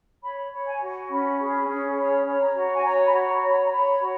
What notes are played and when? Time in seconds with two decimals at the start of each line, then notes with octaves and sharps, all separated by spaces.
0.23 C#5 B5
0.52 C#5
0.67 G#5
0.81 F#4
1.10 C#4 B5
1.39 G#4
1.68 C#4
1.97 C#5 B5
2.26 C#5
2.41 A#5
2.55 F#4
2.75 G#5
2.84 C#5 A#5
3.06 B5
3.13 F#4
3.27 A#5
3.42 C#5
3.50 B5
3.66 A#5
3.71 C#5 B5
4.00 F#4